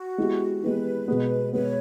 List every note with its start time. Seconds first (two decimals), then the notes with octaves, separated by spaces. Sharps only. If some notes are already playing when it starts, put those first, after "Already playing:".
Already playing: F#4
0.18 G#3 B3 E4 G4
0.62 G#3 B3 E4 G4 B4
1.08 B2 G#3 B3
1.53 B2 G#3 B3 B4 C#5